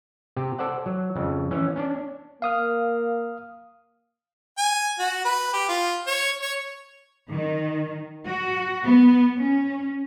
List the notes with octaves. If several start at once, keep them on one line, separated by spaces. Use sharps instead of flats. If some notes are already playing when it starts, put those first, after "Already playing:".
C3 G4
A4 C5 D5 F#5
F#3
F2 C#3
E3 C#4
C#4 D4 D5
A#3 F5 D#6 F6
G#5
F#4
B4
G4
F4
C#5
C#5
D#3
F#4
B3
C#4